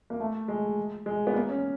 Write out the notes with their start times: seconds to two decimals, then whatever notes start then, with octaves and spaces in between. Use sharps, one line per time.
0.10 A#3
0.20 A3
0.48 G#3
1.06 G#3
1.27 B3
1.34 A#3
1.49 C#4